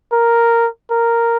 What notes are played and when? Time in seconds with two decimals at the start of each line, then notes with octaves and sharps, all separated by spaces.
0.12 A#4
0.91 A#4